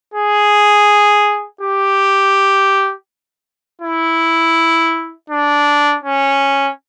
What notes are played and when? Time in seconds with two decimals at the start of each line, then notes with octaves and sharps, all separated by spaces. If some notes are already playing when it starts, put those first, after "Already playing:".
0.14 G#4
1.61 G4
3.81 E4
5.30 D4
6.03 C#4